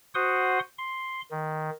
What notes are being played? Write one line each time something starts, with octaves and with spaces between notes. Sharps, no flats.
F#4 C5 F#5 C6 D#6
C6
D#3